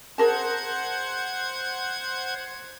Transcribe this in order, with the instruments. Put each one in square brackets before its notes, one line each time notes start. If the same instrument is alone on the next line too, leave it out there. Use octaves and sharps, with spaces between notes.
[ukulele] G#4 A#4 A5 [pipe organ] C5 F#5 G#6